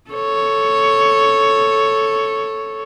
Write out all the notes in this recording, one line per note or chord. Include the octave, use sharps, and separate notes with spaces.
A4 C#5